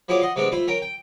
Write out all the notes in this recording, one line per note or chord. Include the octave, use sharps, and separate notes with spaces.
F3 E4 F#4 G#4 C#5 D5
D#5 F#5 C6
C3 G#3 A3 B3 C4 D4
A3 E4 F4 C5
C#4 A#4 G5
G5